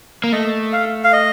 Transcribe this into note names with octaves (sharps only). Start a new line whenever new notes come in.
A#3
A3 D#5
F5
F5
D#5